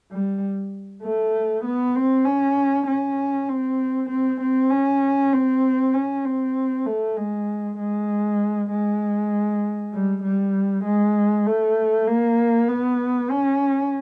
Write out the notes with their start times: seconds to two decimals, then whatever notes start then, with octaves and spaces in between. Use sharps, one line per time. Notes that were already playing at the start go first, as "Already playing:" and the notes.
0.12 G3
1.03 A3
1.65 B3
1.95 C4
2.25 C#4
2.87 C#4
3.49 C4
4.10 C4
4.41 C4
4.71 C#4
5.33 C4
5.94 C#4
6.25 C4
6.86 A3
7.17 G#3
7.78 G#3
8.70 G#3
9.94 G3
10.23 G3
10.84 G#3
11.47 A3
12.07 A#3
12.69 B3
13.31 C#4